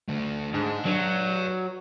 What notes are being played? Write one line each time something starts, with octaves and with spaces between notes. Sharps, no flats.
D3 A3
G#2 D4
F#3 B4 D5